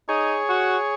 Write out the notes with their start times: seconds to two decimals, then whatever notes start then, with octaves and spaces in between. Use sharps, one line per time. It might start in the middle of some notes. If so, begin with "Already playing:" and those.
0.09 D#4 G#4 C#5
0.49 F#4